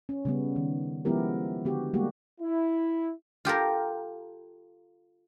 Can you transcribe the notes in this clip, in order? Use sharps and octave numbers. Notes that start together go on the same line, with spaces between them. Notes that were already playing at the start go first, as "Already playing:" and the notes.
C#4
C#3 G3 B3
D#3
F3 G#3 B3 E4 G4 A#4
D3 B3 F#4 G4
G3 G#3 A#3 F#4 G4
E4
F4 G4 A4 A#4